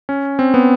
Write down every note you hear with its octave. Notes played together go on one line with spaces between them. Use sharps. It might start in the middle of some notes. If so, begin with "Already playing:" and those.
C#4
C4
B3